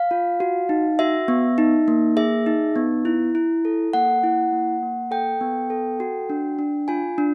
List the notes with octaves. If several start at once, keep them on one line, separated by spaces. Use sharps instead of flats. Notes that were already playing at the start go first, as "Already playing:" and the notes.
Already playing: F5
F4
F#4
D#4
F#4 E5
B3
D#4
A#3
G#4 E5
D#4
B3
E4
E4
A4
A#3 F#5
E4
A#3
A#3
A4 G5
B3
A4
F#4
D4
D4
F4 G#5
D4